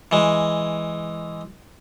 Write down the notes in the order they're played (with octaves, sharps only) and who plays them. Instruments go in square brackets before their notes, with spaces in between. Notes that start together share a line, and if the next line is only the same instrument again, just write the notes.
[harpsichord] E3 G#3